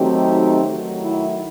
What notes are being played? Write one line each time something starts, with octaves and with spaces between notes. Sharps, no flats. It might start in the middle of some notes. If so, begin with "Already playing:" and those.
Already playing: D#3 F#3 A3 C4 D#4 G4
D#3 F#3 A3
E4